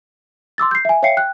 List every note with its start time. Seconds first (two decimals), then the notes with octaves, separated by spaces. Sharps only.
0.58 C6 D6 E6 A6
0.71 G6 C7
0.85 E5 G#5
1.03 C#5 E5 F5 G5 C7 C#7
1.17 G5 F#6